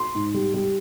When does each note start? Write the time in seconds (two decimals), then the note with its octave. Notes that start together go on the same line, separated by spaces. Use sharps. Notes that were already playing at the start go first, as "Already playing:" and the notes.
Already playing: C6
0.15 G#2
0.34 G3
0.54 G3